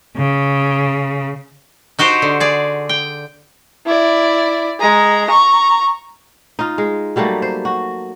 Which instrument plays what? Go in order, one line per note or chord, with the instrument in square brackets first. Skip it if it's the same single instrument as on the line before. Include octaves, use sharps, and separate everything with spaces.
[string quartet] C#3
[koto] D#4 F#4 G4 C5
D3
G#4 D5
G5
[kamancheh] E4 D5
G#3 A#5
A#5 C#6
[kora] D#4 F4
G#3
F#3 G3 A3 A#3
C5
F#4